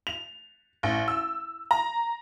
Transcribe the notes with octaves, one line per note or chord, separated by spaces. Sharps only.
F7
A1
E6
A#5